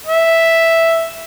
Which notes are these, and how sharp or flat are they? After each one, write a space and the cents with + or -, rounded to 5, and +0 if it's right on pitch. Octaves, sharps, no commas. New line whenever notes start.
E5 +0